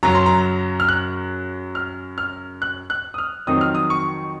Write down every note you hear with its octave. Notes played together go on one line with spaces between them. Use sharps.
F#2 C#3 F#3 A#5
C6
A#5
F6
F#6
F6
F6
F#6
F#6
D#6
F6
F2 D#3 F#3 C4 D#4 D#6
F6
D#6
C#6